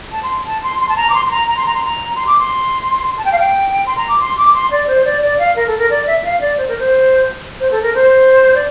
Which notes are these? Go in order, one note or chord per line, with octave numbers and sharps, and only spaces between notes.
A5
C6
A5
C6
C6
A5
A#5
D6
C6
C6
A#5
A#5
C6
A#5
C6
A#5
C6
D6
C6
A5
G5
F5
G5
C6
A#5
D6
C6
D6
C6
D5
C5
D5
D5
F5
A#4
A4
A#4
D5
E5
F5
D5
C5
A#4
C5
C5
A4
A#4
C5
D5